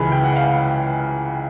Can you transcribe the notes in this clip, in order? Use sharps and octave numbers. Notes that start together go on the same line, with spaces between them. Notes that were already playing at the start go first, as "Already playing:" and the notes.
Already playing: C#2 C#3 E3 G#3 B5
G5
F#5
F5